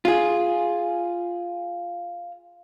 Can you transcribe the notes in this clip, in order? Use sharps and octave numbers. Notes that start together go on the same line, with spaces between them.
F4 G#4